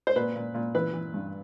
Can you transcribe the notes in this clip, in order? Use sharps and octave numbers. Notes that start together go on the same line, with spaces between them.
C5
A#2 B4
A#2
A#2
E3 B4
E3
G2